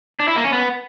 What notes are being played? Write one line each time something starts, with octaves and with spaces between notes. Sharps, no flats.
D4
E4
A#3
C#4
B3